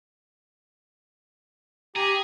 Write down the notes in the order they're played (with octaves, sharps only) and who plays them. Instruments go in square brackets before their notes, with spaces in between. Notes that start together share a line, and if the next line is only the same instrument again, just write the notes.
[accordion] G4 A#5 [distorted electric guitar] G#4